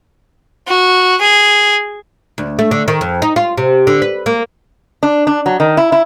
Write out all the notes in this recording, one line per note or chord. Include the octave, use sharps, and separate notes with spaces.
F#4
G#4
D2
A3
D3
D#3
F2
D#4
F4
C3
D3
B4
A#3
D4
D4
F#3
D#3
E4
E4